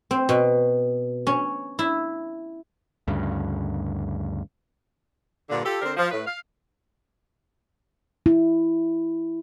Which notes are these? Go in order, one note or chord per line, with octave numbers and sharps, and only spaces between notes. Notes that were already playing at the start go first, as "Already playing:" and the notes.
C4
B2
C#4
E4
D2 G2 C#3
G2 A#2 D3
F4 G4 A4
D3 C4 A#4 C5 D5
F3
A2 B4
F5
E4